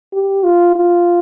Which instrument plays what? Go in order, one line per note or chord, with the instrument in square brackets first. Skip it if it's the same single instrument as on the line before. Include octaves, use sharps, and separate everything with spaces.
[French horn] G4
F4
F4